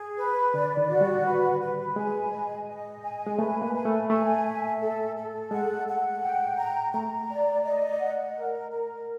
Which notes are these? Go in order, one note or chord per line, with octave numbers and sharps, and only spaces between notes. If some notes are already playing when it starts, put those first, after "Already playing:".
Already playing: G#4
B4
D3 D5
D#3
F#4
G3
B4
B4
G#3 G#5
D#5
D#5
G#5
G#3
A3 B4
A#3
G#5
A3
A3 G#5
E5
A4
A4
G#3 F#5
F#5
G5
A#5
A3 A#5
D5
D#5
F#5
A#4
A#4